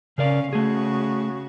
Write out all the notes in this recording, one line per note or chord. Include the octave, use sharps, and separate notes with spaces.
C#3 C#4 A#4 D5 F5
C#3 A3 F#4 G#4